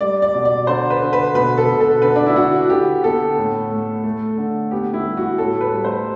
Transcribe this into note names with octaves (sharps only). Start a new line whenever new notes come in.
G3 D5
D5
B2
D5
D3 C5
B4
D3
B4
B2 B4
A4
B2
A4
D3 B4
D4
E4
D3 F#4
D3 G4
B3 A4
A2
A3
A3
D3
B3 G4
E4
G3
F#4
A2 A4
B4
G3
C5